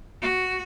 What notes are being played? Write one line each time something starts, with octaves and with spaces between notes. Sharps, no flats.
F#4